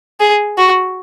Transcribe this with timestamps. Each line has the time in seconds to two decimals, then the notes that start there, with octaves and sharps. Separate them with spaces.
0.20 G#4
0.58 F#4